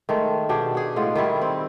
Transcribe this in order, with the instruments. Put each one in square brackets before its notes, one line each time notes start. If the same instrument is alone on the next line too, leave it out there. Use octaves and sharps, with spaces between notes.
[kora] D#3 G#3 A3
B2 D4 G4 G#4
G#4 F#5
A2 G#3 F4 F#5
D#3 G3 E4
C4